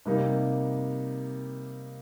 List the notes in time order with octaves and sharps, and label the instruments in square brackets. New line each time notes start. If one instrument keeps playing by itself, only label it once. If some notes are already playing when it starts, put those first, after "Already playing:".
[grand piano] C3 G3 A#3 D#4